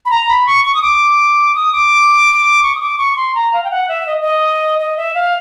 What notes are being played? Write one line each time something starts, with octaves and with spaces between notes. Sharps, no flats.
B5
A#5
B5
C#6
C#6
D#6
D6
D#6
D6
C#6
D#6
D6
C#6
C6
A#5
F5
G5
F#5
E5
D#5
D#5
D#5
E5
F5